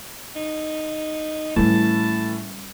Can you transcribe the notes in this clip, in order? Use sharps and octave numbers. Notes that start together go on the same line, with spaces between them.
D#4
A2 E3 G3 C#4 A5